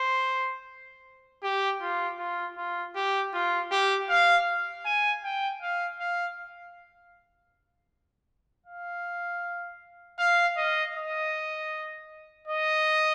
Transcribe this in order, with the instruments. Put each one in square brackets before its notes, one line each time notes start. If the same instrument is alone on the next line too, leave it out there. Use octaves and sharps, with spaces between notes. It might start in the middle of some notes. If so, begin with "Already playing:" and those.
Already playing: [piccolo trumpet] C5
G4
F4
F4
F4
G4
F4
G4
F5
G#5
G5
F5
F5
F5
F5
D#5
D#5
D#5